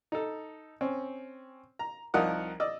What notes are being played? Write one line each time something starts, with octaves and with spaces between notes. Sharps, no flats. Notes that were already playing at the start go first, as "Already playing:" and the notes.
D#4 A4
C4 C#4
A#5
C2 F3 D#4 A#4 F#5 D#6
D5 D#5 E6